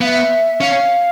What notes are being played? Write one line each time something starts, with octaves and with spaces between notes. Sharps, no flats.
B3 E5 F5
C#4 F5